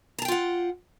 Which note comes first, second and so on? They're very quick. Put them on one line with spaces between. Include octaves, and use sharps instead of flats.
A#5 A5 G5 F4 F#5